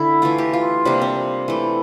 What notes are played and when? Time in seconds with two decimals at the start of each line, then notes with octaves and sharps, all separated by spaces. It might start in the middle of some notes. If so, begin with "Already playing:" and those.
Already playing: D3 E4
0.22 E3 A3 F4
0.38 G4
0.54 F4
0.85 C3 G3 A#3 D4
1.02 C4
1.48 E3 A3